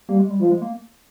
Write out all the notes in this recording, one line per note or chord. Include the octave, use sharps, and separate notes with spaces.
G3 A#3
G#3
G3
F3 G#3
G#3
A#3